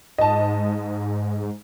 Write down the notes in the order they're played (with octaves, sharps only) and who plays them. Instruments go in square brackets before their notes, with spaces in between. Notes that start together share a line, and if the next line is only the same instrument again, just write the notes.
[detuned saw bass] G#2 [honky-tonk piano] D#5 A5